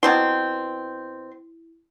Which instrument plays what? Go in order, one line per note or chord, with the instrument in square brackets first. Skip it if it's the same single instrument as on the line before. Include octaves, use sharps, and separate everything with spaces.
[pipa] B2 C4 C6 [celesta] E4